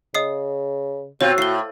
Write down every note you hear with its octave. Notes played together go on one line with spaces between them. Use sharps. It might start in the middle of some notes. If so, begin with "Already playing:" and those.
C#3 D#5 D#6 C7
B2 C4 F4 F#4 C#5
A2 C7 G7